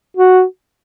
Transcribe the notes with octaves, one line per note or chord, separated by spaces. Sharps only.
F#4